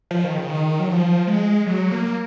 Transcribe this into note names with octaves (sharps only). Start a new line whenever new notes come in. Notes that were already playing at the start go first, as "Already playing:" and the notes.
F3
D#3
C#3
D#3
F#3
F3
G#3
F#3
A#3